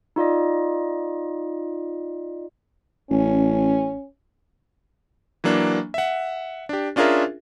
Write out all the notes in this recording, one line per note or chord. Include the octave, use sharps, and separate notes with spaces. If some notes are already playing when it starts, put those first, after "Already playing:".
D#4 F4 D5 D#5
A1 C#4
E3 F#3 A#3 D4
E5 F#5
D4 G4
C#4 D4 F4 G#4 A#4 E5